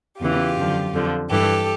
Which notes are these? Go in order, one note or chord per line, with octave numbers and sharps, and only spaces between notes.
E2 C#3 E3 F4 G4
F#2 D3 F3
F2 D3 F3
G2 E3 G4 A4